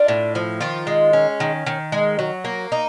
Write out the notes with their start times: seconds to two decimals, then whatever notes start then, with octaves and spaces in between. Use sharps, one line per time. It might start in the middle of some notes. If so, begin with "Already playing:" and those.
Already playing: D4 F4
0.08 A2
0.35 F3
0.60 D#3 F4
0.87 G#3
1.13 C#4
1.40 D#3
1.66 D#3
1.92 G#3
2.19 F#3
2.44 A#3
2.72 D#4